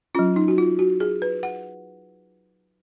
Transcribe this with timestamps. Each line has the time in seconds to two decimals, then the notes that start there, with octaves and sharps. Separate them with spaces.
0.15 F#3 C#4 F4
0.36 D#4
0.48 F#4
0.58 F4
0.79 F#4
1.00 G#4
1.22 B4
1.43 F#5